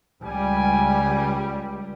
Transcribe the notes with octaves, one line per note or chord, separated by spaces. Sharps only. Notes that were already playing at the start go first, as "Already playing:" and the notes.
C#2 G3 G#5